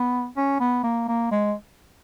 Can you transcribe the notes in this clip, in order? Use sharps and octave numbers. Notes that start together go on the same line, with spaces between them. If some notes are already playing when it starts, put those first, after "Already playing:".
Already playing: B3
C#4
B3
A#3
A#3
G#3